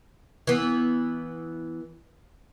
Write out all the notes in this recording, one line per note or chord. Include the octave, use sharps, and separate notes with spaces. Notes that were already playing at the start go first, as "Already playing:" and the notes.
E3 B3